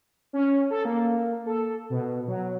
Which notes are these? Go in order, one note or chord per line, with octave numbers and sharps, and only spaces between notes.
C#4
A4
A#3
A4
B2
F#3